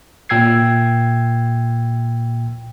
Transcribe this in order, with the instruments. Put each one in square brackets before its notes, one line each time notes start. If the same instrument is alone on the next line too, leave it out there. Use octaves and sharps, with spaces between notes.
[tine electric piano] A#2 G5 E6 G#6 C7